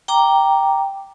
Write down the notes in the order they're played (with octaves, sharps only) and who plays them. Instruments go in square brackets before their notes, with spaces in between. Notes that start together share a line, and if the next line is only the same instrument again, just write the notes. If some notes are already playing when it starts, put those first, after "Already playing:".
[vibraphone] G5 A#5 D6